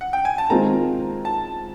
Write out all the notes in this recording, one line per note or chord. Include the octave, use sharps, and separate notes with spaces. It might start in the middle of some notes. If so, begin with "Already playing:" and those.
F#5
G5
G#5
A5
D#3 G#3 C4 F4 A#5
A5